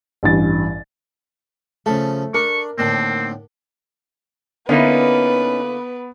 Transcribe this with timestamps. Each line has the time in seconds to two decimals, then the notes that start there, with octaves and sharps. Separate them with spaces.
0.23 A1 G2 A6
1.86 C#3 F3 A3 A4
2.34 D4 A#4 C#6
2.78 D#2 A2 D3 C4
4.69 D3 A#3 B3 C#4 D#4 E4 B4